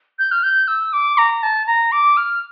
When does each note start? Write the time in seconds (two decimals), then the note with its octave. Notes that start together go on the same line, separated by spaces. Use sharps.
0.19 G6
0.31 F6
0.43 G6
0.68 E6
0.93 D6
1.18 A#5
1.43 A5
1.67 A#5
1.92 D6
2.17 F6